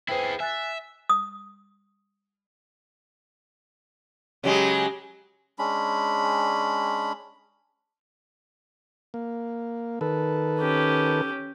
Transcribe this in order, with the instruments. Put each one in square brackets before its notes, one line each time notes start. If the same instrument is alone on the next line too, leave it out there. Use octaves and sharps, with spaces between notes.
[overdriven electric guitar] E4 G#4 [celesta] B4 C5 G5
[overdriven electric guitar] E5 [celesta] G#5 F#6 A6
[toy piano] D#6
[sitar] C#3 F#3 G#3 [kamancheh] G4
[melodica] G#3 C#4 D4 B5
[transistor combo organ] A#3
D#3 A4 B4
[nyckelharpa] C#4 G4